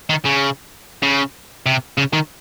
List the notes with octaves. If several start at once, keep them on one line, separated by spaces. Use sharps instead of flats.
D#3
C#3
C#3
C3
C#3
D#3